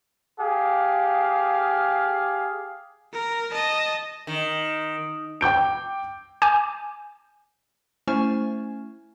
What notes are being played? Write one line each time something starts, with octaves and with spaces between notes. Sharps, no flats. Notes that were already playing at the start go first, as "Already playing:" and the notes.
G4 G#4 F5
A#4
D#5 A5
D#3
G5 D6 G6 D7
G#5 D6 G6
A3 C#4 E4 C5 G#5 C#6